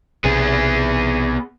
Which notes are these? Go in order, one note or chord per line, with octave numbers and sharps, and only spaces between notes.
B1 C3 B3 G#4